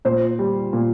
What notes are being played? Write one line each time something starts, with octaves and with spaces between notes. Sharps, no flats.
A#2 C5
G3
A#2